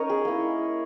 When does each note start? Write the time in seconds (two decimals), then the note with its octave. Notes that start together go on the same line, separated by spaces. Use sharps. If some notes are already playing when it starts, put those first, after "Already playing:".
Already playing: C#4 D#4 A#4 C#5 D#5
0.10 G#4
0.25 A#3 E4